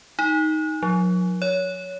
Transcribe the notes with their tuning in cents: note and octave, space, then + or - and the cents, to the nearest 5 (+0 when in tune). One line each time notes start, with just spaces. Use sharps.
D#4 +10
F#3 -40
C#5 +20